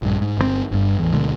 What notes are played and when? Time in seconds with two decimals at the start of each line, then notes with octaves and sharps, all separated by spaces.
0.02 A#1 G2
0.21 G#2
0.38 G1 C#3 C4
0.71 G1 G2
0.99 A1 E2
1.14 D2 B2 D3 G#3